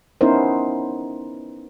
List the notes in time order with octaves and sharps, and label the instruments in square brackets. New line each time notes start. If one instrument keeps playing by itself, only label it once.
[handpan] B3 C#4 D#4 E4 A#4 C5